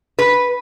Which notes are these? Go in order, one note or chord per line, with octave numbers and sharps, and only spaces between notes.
B4